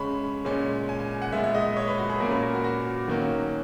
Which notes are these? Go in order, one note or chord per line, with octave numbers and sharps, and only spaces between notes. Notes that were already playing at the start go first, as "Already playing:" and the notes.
Already playing: C#3 G#3 C#4 B5 C#6
A#2 G#3 C#4
G#5
G#5
F#5
A#2 G#3 B3 E5
E5
D#5
C#5
B4
F#4
G#4
A#2 A#3 C#4 A#4
B4
A#4
F#4
F#4
D#3 F#3 A#3 C#4